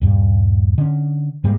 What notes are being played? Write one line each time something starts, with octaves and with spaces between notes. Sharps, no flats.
D#1 G2
D3 C#4
G#2 G3 G#3 A#3